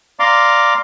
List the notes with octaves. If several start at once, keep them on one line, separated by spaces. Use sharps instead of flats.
D5 F5 A#5 C6 D6